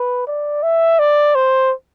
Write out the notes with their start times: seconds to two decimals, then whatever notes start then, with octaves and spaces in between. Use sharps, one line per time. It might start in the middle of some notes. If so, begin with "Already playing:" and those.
Already playing: B4
0.27 D5
0.63 E5
0.99 D5
1.35 C5